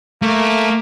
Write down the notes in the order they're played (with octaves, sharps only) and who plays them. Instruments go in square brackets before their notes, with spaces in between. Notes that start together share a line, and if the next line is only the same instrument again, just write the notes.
[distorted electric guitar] A3 [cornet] A#3